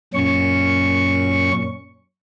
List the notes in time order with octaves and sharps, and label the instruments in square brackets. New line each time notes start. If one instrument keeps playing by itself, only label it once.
[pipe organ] F#2 A#2 C#4 C#6